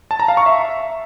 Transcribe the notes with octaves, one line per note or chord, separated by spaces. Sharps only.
A5
A#5
F5
C#6
E5